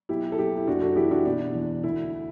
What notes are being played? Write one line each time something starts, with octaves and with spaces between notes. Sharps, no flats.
B1 E4 G4
A4
B1 E4 G4
E4
F#1 D4 F#4
F#4 A4
E3 E4 G4
D4 F#4
B2 D4
E2
D2 E4